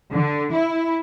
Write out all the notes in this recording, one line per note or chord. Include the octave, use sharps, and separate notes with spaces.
D3
E4